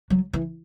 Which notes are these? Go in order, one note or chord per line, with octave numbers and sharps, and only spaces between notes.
F#3
E3